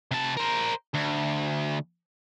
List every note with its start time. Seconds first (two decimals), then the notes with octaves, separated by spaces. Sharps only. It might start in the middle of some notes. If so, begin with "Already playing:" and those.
0.11 C3 A5
0.37 A#4 C5
0.94 D2